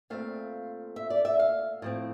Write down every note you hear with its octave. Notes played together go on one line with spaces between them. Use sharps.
A#2 A3 C4 F5
E5
D5
E5
F5
A2 F3 C4